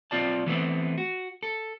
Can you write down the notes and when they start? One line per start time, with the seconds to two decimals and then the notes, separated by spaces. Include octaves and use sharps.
0.11 B1 G#3 C4 F4 D5 A5
0.46 E3 A3 B3 C4
0.98 F#4
1.43 A4